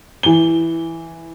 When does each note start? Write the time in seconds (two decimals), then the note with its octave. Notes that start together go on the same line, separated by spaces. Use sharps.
0.23 E3 G7